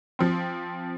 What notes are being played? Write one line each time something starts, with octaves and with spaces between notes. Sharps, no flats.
F3 C4